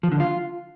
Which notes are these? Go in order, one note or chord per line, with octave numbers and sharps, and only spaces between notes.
F3
D3
F4